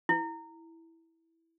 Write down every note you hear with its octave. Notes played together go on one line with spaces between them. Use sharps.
E4